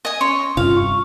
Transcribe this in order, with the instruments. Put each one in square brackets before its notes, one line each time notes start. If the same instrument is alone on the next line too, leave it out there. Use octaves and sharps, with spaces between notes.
[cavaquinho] D#5 G#5
[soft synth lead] C#4 [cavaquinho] C#5 C6
[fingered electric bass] G2 C3 [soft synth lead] F4 [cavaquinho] F5
[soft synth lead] C#6